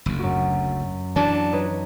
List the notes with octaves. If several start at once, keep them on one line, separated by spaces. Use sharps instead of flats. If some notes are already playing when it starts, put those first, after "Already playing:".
F#1 D2
F#2 F#4
E3 F#3 D4 D7
D#4 B4 C#5